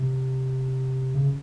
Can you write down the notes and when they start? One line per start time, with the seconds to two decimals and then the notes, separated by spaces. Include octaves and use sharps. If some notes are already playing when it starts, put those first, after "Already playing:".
Already playing: C3
1.15 C#3